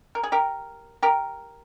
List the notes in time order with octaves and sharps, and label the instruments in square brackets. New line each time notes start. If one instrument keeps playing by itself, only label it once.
[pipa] A#4
G#4
G4 A#4
G4 A#4